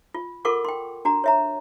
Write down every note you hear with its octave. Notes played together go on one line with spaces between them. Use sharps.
F4
F4 A4 A#4 F#5 C#6 D6
G5 C6
D4 F#4 A#5
C#5 E5 A#5